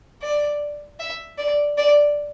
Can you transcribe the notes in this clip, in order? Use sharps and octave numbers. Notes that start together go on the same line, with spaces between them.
D5
E5
D5
D5